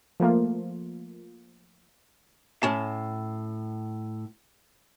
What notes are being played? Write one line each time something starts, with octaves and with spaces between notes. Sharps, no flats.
F3 A3 A#3 F4
A2 C#4 A5